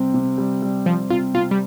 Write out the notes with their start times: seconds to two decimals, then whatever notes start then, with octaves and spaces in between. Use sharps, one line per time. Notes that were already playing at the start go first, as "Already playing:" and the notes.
Already playing: C3 G3 C4
0.14 C3
0.38 G3
0.62 G3
0.86 F3 C4
1.10 C3 F4
1.34 C3 F4
1.51 G3